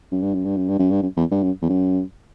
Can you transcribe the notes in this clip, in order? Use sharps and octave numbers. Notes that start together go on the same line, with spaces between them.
F#2
G2
F#2
G2
F#2
G2
F#2
G2
F#2
E2
G2
F#2
E2
F#2